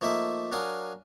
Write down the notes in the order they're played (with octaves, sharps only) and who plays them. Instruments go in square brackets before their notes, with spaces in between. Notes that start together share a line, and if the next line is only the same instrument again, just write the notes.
[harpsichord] F3 A3 A#3 D#4 E5
F#3 D4 A#4 F5 G#5 D#6